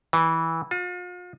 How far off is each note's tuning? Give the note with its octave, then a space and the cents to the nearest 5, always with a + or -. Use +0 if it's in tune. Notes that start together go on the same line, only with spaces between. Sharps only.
E3 -15
F4 +40